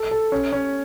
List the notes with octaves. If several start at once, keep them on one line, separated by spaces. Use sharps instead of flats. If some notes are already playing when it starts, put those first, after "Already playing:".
Already playing: A4
A4
C#4
C#4